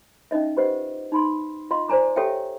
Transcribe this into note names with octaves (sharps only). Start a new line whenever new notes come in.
C#4 D#4 D#5 E5
F4 G4 B4 C5 D#5 F#5
D#4 B5 C6
F4 D#5 F5 C6
C5 D5 G#5 A#5 D6
G4 A4 C#5 E5 F5 G5